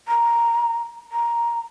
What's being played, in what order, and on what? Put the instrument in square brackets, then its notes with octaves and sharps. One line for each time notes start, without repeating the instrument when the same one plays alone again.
[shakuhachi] A#5
A#5